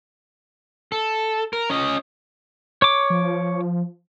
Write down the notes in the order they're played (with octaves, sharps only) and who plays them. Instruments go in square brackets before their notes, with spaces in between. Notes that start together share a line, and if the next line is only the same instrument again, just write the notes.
[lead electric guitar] A4
A#4
C#4 D#5
[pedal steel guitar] C#5 D6
[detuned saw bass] F3